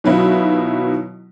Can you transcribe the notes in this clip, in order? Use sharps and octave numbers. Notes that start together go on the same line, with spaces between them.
B2 D#3 F#3 B3 E4 F4